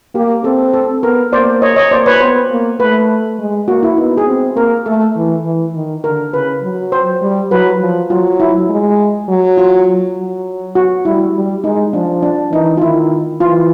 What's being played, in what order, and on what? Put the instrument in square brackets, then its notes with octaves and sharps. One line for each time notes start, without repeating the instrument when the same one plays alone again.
[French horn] A#3 [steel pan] G4
[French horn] C4 [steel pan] A4
[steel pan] A4
[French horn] B3 [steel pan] A#4
[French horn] A#3 [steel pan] C5 D5
[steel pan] C#5 D#5
C#5 D#5
[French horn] A#3 [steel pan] C5 D5
[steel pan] B4 C#5
[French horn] B3 [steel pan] C5
[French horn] A#3
[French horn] A3 [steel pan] B4
[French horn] G#3
[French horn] A#3 [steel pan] F#4
[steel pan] E4
[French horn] B3 [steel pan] D#4
[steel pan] G#4
[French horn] C4
[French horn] A#3 [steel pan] A#4
[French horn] A3 [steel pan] A4
[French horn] E3
E3
D#3
[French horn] D3 [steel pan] A#4
[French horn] C#3 [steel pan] B4
[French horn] F#3
[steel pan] C5
[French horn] G3
[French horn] F#3 [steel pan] B4
[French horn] F3
[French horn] F#3 [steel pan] F4
[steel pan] E4
[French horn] G#3
F#3
[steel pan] F4
[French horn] F#3
[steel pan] F#4
[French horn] G3 [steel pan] E4
[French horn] G3
[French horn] G#3 [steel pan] D#4
[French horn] F3 [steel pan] D4
[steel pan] D4
[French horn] E3 [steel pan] D#4
[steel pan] F4
[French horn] D#3 [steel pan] E4
[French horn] E3 [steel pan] F4